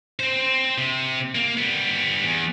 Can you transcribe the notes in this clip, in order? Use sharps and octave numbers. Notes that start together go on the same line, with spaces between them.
C4 C5
C3
A#3
G3 B3
E2